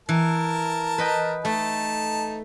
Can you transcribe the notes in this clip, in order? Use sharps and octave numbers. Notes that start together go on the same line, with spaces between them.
E3 A#4 A5
B4 D#5 G5
A3 D#4 A5